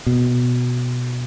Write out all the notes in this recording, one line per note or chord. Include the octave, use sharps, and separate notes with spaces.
B2